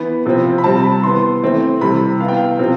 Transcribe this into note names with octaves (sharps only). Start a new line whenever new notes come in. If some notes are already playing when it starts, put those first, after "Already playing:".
Already playing: E3 B3 B5
C3 F3 C4
B5
C3 G3 C4 A5
B5
E3 B3 C6
E3 A3 C4
C3 E3 G3 B5
E3 B3 F5
G5
F5
C3 F3 C4